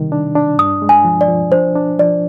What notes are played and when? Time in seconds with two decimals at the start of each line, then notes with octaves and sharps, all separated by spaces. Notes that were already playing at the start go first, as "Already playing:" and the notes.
Already playing: C3 D#3 G3
0.12 D4
0.35 D4
0.58 G2 D#6
0.82 G#3
0.89 G#5
1.05 F3
1.21 D5
1.28 F3
1.52 D4 C5
1.75 D4
1.99 F3 D5